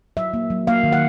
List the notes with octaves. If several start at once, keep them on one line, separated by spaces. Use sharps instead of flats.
F#3 E5
A#3
F#3
A#3 F5
D#3
F#5